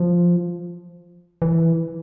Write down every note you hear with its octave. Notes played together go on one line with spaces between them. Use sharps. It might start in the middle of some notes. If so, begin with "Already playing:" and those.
Already playing: F3
E3